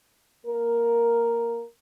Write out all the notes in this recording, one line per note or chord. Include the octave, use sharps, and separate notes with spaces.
A#3 A#4